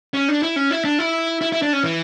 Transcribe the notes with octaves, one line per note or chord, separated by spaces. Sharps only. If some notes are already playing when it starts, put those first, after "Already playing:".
C#4
D4
E4
C#4
E4
D4
E4
E4
E4
D4
C#4
E3